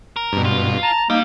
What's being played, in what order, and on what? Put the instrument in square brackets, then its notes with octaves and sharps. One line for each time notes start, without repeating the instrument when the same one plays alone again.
[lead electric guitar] A#4
[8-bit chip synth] G2 B2
[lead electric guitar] F4
[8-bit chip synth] A5 [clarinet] A#5
[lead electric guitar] G3 [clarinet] A#3 [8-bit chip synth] D#4